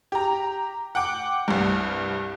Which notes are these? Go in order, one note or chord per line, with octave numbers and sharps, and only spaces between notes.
G4 A#5
F#5 G5 D6
C2 G2